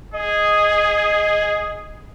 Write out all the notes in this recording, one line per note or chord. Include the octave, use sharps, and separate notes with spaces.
G#4 D#5